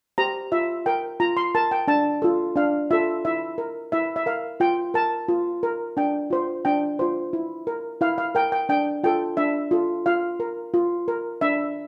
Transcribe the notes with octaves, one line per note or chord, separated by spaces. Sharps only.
G4 C5 A#5
F4 E5
A#4 G5
F4 A#5
C6
A#4 A5
G5
D4 A5
F4 A4
D4 F5
F4 A4 E5
E4 E5
A#4
E4 E5
E5
A#4 F5
F4 G5
A#4 A5
F4
A#4
D4 G5
F4 C5
D4 G5
F4 C5
E4
A#4
E4 F5
F5
A#4 G5
G5
D4 G5
F4 A4 G5
D4 E5
F4 A4
F4 F5
A#4
F4
A#4
D4 E5